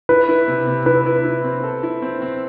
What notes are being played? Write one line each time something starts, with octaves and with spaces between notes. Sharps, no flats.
E4 B4
E4
C3
C3
E4 B4
E4
E4
C4
A4
E4
C4
C4